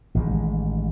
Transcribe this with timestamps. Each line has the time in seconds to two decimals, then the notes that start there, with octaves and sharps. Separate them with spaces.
0.15 A1 D#3 G#3